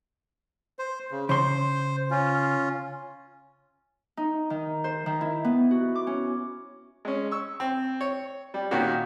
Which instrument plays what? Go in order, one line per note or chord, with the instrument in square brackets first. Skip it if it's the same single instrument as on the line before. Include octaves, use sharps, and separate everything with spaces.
[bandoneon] C5
C#3
[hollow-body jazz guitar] C#3 C6 [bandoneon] C5
[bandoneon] C#4 F4
[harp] D#4
D#3
C5
D#3
E4
B3
F#4
D6
C#4
[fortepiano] G#3 C#4
C#6 E6
C4
C#5
G3
A#2 D#3 A#3 C#4 F#4 G4